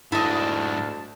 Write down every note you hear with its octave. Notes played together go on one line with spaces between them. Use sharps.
D2 G#2 D4 E4 D#5 A5